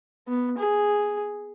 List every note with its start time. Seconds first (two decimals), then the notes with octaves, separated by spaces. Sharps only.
0.28 B3
0.58 G#4